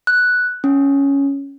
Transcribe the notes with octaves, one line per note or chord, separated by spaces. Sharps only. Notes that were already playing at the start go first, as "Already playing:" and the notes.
F#6
C#4